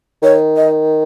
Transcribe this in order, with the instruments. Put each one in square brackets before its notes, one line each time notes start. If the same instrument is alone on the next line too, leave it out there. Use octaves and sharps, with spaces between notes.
[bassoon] D#3 [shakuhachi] C#5
[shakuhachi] D#5